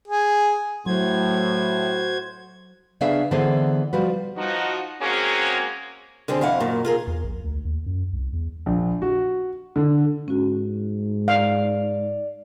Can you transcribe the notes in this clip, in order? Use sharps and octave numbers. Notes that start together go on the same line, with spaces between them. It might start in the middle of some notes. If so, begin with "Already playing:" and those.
G#4
A2 F#3 F#4 C5 G#6
C#3 B3 D4 G#4 E5 F5
D3 E3 B3 D#4 G#4 C5
F3 G3 F#4 B4
F3 D#4 F#4
G#3 A#3 C4 C#4 F#4 G#4
D3 G3 C4 G#4
F2 E4 F5 F#5
F#2 A#2 D#3
F4 G#4 A#4
E2
A#1
D2
D#2
F#2
C2
E2
A#1
F#4
D3
G#2 C#4 F#4
D5 F5